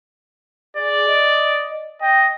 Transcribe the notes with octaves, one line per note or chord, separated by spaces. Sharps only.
G#4 D5
D#5
D#5 G5